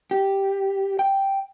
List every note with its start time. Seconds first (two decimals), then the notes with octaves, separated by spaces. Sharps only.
0.11 G4
0.99 G5